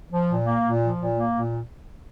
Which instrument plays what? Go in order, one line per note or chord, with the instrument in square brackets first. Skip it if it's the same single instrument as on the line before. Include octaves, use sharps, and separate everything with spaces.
[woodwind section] F3
A#2
A#3
A#2
F3
A#2
A#3
A#2